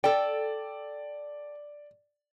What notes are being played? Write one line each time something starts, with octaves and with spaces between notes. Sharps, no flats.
A4 D5 G5